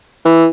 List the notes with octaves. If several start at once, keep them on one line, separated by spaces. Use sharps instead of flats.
E3